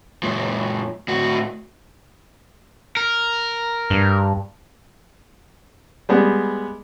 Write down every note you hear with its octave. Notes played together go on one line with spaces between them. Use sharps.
F#2 A#2
A2 F#4
A#4
G2
G3 G#3 B3